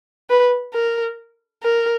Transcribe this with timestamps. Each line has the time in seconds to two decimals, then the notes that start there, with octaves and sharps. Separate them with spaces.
0.30 B4
0.74 A#4
1.63 A#4